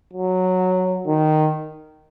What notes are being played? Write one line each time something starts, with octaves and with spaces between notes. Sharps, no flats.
F#3
D#3